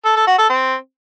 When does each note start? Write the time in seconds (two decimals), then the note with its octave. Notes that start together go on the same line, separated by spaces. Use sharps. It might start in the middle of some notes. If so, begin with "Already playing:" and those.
0.05 A4
0.16 A4
0.27 F#4
0.38 A4
0.49 C4